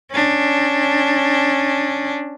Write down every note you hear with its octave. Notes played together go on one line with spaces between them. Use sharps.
C#4 D4